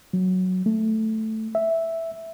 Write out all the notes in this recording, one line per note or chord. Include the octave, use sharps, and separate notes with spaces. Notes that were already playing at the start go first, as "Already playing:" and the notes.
F#3
A3
E5